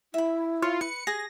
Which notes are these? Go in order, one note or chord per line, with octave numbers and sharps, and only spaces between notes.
E4 E5 B5
F4 C#5
B4 C#7
G#4 D#6 A#6